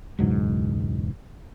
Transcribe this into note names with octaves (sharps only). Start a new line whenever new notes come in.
E1 C#2 G#2 F#3